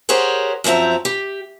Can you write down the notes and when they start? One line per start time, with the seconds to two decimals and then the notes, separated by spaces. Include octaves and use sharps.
0.09 G4 G#4 A#4 C5 C#5 F#5
0.64 F#2 F3 C4 E5 A#5
1.05 G4